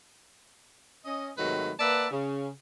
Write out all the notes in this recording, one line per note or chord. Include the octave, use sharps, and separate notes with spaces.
C#4 D#5
G#2 C3 D#3 F#3 A3 B4
A#3 B4 D5 E5 F#5 A5
C#3